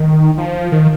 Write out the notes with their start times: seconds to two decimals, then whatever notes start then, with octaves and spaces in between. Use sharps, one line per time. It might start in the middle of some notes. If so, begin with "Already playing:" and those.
Already playing: D#3
0.38 F3
0.72 D#3